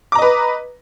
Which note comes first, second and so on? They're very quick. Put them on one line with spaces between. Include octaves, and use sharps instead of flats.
D6 A#5 D#5 B4